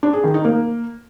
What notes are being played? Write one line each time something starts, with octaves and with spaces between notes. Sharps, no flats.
D4
G#4
D#3
D#4
A#3